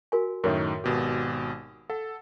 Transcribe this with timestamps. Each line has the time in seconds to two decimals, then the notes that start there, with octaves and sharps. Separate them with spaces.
0.12 F#4 A#4 G#5
0.44 F#2 A2 D#3 A#4 C#5 E5
0.84 G#1 B2 G4
1.90 A4 F#5